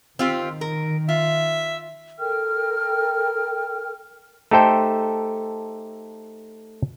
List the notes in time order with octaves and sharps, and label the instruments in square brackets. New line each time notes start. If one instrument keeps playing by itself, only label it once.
[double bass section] D#3 [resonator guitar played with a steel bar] C4 F4 G4
[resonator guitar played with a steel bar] A#4
[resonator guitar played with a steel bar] F4 [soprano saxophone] E5
[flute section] A4 A#4 G5 F6
[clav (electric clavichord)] A3 D#4 G4 A4 C5 G5